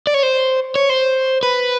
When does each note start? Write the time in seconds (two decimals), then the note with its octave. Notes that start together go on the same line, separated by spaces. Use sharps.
0.07 D5
0.14 C#5
0.23 C5
0.76 C#5
0.89 C5
1.43 B4